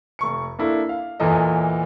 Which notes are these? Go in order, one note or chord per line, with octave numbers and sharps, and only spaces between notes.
F1 C#6 C#7
A#3 D4 E4 A4
F5
E2 A#2 E3 A4 D#5